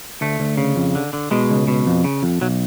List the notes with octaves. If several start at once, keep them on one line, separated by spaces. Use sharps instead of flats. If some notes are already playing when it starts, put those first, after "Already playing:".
D2 A3
D2
C#3
F2
D3
D3
B2 G#3
C#2
B2
F2
C#3
F2
B1 F#3